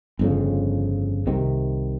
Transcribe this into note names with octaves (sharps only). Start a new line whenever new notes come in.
G1 F2 C#3
C2 C3 D#3